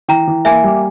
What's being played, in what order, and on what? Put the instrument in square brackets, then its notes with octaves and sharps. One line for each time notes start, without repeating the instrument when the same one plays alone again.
[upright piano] E3 [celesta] G5 A#5
[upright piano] E3
[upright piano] A#3 [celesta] E5 G#5
[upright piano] G3